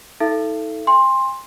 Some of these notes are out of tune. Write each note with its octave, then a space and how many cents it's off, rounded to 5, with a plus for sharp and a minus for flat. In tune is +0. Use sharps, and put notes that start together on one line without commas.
D#4 +40 A4 +0 E5 +45
G#5 -45 C6 +10